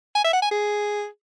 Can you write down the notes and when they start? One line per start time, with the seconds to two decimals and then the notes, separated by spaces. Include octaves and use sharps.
0.15 G#5
0.24 E5
0.33 F#5
0.42 G#5
0.51 G#4